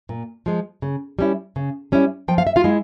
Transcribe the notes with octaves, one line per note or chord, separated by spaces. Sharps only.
A#2
F3 G#3
C#3
G3 C#4 E4
C#3
G3 C#4 E4
F3 G5
F5
E5
F4 F5
G#3 E4